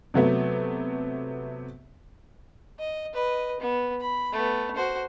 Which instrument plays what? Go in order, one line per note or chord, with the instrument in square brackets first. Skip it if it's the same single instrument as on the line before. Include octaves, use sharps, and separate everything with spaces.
[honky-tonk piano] C3 F#3 A3 B3
[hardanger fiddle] D#5
B4 D#5
B3
B5
A3 B3
F#4 C5